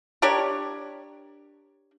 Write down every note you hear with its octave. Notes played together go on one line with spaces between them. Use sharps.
D4 G4 A#4 C#5